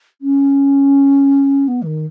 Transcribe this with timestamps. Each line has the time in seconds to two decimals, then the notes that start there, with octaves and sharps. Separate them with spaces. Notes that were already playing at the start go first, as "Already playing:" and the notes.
0.21 C#4
1.68 B3
1.82 E3
1.86 D#3